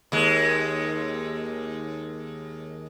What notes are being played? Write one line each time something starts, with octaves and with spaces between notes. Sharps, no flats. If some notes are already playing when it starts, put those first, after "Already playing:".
D#2 G#3